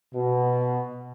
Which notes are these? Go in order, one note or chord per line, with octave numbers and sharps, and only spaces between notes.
B2